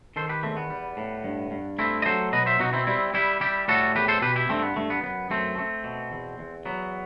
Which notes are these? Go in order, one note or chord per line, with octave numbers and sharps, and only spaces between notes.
D#3 A4 C5
G4 B4
E2 A3 C4
B3
G3
A2
G2
G2
A3 C4 E4
D#5
F#3 A4 C5
B2 B4 D#5
C5 E5
B2 D#4 F#4
C4 E4
G3 C4 E4
G3 E4 G4
G3 E4 G4
A2 F#4 A4
E2 G4 B4
A4 C5
B2 G4 B4
E4 G4
G2 A3 C4
B3
G2 A3
B3
F#2 B3
F#2 A3 C4
A3
B2
E2
E2
F#3 B3